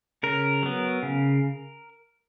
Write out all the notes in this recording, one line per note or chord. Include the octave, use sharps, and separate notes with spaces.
C#3 A#4
F#3 B3
C#3